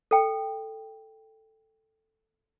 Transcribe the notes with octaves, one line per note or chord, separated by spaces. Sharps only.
A4 G5